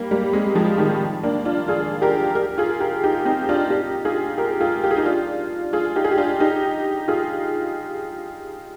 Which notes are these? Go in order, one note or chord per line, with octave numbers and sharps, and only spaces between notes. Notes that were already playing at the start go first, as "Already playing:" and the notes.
Already playing: G3 A#3
G3 A#3
G#3 C4
F3 G#3
D#3 G3
A#3 D4
D4 F4
F4 G#4
G4 A#4
G4 A#4
F4 G#4
G4 A#4
D#4 G4
C4 D#4
D4 F4
D#4 G4
F4 G#4
G4 A#4
F4 G#4
G4
G#4
D#4 G4
D4 F4
F4 G#4
D#4 G4
G#4
G4
D4 F4
D#4 G4
F4 G#4